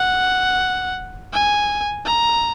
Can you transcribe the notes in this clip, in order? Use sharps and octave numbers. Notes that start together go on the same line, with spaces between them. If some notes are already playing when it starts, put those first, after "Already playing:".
Already playing: F#5
G#5
A#5